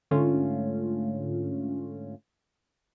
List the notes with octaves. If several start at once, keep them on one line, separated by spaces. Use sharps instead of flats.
G#2 D3 A3 C#4 F4